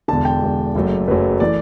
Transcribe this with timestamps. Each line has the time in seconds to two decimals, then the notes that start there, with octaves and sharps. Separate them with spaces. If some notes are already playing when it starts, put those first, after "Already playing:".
0.08 E1 E2 D3 A5
0.25 G5
0.42 E1 E2 D3
0.75 F#1 F#2 F#3 A3
1.08 F#1 F#2 F#3 A3 B4
1.40 E3 A3 D5